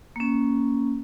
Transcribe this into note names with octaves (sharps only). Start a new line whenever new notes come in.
A#3 C#4